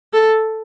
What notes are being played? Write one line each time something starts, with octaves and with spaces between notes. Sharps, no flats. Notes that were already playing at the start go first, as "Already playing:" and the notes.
A4